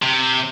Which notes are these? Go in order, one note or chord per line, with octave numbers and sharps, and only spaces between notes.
C3